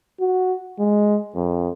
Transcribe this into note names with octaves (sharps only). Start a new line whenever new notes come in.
F#4
G#3
F2